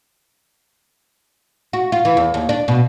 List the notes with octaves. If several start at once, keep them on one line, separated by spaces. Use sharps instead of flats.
F#4
F4
E3
E2
D#2
D4
B2